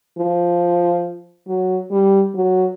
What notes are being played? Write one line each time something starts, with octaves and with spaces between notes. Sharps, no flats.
F3
F#3
G3
F#3